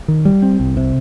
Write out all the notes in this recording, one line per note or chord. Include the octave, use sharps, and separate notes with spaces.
D#3
G3
C4
C2
C3